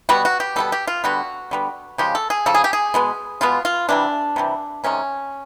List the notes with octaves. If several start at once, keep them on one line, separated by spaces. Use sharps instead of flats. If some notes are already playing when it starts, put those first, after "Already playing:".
B2 G3 B3 F#4
F#4
G4
B2 G3 B3 A4
G4
F4
D3 G3 B3 F#4
D3 G3 B3
C#3 F3 G#3 G4
A4
G#4
C#3 F3 A4
G#4
G4
G#4
B2 G#3 B3
B2 G#3 B3 F4
F4
C3 E3 G3 D4
C3 E3 G3
C3 D#3 G#3 C#4